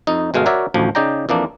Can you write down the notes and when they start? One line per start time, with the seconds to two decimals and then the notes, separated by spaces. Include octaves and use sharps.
0.07 F2 D#4
0.34 G1 B2 G#3 A3 F5
0.46 F#4 A#4 C#5 D5 E5
0.74 A1 D2 F3
0.95 C#3 D#4 D5 G5 A#5
1.29 F2 E3 A#3 D4